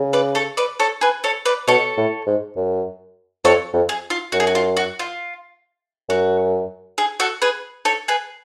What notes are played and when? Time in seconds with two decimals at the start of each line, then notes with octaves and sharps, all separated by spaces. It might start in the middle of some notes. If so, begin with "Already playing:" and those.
Already playing: C#3
0.13 B4 D5
0.35 A4 C#5
0.57 B4 D5
0.80 A4 C#5
1.01 G#4 B4
1.24 A4 C#5
1.45 B4 D5
1.68 B2 A4 C#5
1.97 A2
2.27 G#2
2.56 F#2
3.44 F2 A4 C#5
3.74 F2
3.89 G#4
4.10 F4
4.32 F#2 F#4
4.40 G#4
4.47 F#4
4.55 F4
4.77 F#4
4.99 F4
6.09 F#2 F#4
6.98 G#4
7.20 F#4 A4
7.42 G#4 B4
7.85 A4 C#5
8.08 G#4 B4